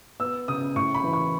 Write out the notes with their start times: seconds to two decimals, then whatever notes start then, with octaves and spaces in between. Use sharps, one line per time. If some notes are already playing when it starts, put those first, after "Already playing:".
0.20 B3 E6
0.48 C#3 D#6
0.76 A2 C#6
0.94 B5
1.04 E3
1.13 C#6